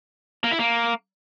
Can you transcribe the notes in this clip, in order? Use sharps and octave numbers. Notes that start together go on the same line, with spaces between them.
A#3
E4
A#3